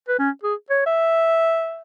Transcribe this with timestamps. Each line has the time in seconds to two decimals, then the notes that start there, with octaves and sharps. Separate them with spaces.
0.08 B4
0.19 C#4
0.43 G#4
0.70 C#5
0.86 E5